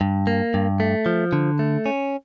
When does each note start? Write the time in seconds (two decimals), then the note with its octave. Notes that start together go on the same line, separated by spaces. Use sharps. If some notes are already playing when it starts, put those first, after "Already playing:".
0.01 G2
0.27 A#3
0.54 G2
0.80 A3
1.06 F3
1.33 D3
1.59 A3
1.86 C#4